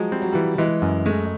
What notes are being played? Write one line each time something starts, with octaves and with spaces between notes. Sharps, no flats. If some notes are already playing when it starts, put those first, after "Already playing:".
Already playing: F3 F#3 G#3
G3 C4
F#3
E3 G3
E3 G#3
F#2
G#3 A3